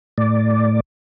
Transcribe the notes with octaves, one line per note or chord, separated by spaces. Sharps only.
A2 D5